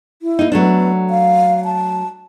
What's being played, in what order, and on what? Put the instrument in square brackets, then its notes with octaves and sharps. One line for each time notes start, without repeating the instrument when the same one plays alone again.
[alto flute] E4
[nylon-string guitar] A#3 D#4
[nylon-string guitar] F#3 A3 D4 [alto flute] B3
[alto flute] F5
A5